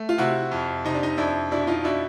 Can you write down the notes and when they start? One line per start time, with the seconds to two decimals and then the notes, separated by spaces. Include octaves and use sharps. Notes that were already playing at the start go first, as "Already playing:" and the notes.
Already playing: A3
0.09 F4
0.18 C3 E4 F#4
0.51 F2
0.85 C3 D#4
0.94 D4
1.03 D#4
1.17 F2 D4 E4
1.51 B2 D4 E4
1.67 D#4 F4
1.84 B2 D4 E4